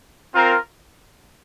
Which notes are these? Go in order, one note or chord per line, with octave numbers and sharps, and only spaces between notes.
C4 F4 A#4